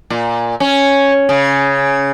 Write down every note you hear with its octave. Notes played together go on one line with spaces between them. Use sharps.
A#2
C#4
C#3